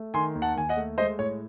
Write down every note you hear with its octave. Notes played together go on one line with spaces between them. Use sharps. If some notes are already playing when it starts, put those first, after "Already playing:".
Already playing: A3
D#3 G#5 C6
D#2
F#5 A5
D#2 G#5
D#5 F#5
A3
G#3 C5 D#5
A2 C#5